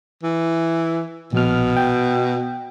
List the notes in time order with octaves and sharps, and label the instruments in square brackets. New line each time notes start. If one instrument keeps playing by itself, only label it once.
[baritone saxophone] E3
[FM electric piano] A#1 F6 [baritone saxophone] B2
[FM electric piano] G5